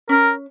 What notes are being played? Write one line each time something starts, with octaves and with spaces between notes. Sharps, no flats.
C#4 A#4